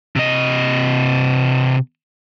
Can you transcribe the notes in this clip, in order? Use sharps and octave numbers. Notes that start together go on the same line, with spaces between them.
C3 D#5